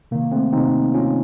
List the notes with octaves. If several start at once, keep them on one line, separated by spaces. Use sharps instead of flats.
C3 D#3 A#3
A3 C4
C3 D#3 C4 D#4
C3 D#3 C#4 F4